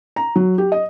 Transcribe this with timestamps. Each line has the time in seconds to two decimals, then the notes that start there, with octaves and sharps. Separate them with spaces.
0.16 A#5
0.36 F#3
0.58 G4
0.72 D#5